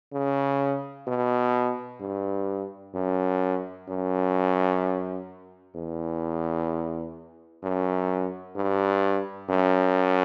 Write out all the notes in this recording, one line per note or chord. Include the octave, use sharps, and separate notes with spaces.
C#3
B2
G2
F#2
F#2
E2
F#2
G2
F#2